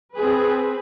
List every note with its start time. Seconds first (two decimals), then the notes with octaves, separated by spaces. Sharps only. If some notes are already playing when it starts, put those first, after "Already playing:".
0.16 C4 G#4 B4